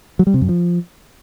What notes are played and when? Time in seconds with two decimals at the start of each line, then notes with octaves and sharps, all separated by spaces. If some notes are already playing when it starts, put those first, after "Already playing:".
0.19 F#3
0.27 G3
0.34 C3
0.41 F#2
0.49 F3